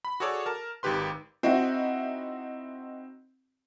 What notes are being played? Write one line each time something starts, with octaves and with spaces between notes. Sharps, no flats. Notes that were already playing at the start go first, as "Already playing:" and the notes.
B5
F#4 G#4 A4 C#5 D5
A#4 A5
G#1 D#3 G4 B4 C6
C4 D#4 E4 F#4